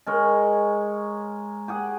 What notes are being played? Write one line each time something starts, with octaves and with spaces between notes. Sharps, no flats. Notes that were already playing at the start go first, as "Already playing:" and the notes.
G#3 A#4 C#5
G4 G#4 F#5